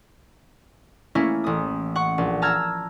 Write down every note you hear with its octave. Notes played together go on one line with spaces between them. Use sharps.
A3 A#3 C#4 E4
A1 D#6
F#5 C#6
A#1
A5 A#5 E6 F6 G#6